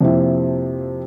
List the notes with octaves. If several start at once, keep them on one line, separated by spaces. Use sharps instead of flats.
F2 C3 F3 A#3 C4 E4